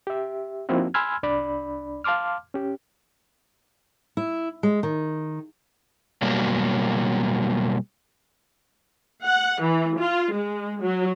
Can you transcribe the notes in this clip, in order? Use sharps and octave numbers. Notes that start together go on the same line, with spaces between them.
G4 E5
F3 A#3 C4 D#4 E4 F#4
G#5 B5 C6 E6 F6 G#6
C2 D4 D5 B5
F5 A5 C6 D6 F6
C#4 G4
E4
G#3
D#3
B2 F#3 G3 A#3
F#5
E3
F4
G#3
F#3